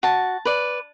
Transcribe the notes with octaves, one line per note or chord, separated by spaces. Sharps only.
F#4 A5
B4 D5